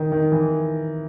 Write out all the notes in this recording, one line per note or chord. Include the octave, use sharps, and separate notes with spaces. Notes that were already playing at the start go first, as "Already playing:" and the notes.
Already playing: D#3
D#3
E3